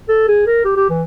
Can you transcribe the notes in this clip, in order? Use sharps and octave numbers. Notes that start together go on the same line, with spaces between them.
A4
G#4
A#4
G4
G4
E3